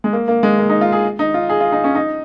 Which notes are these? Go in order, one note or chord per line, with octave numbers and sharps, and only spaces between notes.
G#3
A#3
A#3
G#3
A#3
D#4
F4
G#4
D#4
F4
G#4
F4
D#4
C#4
D#4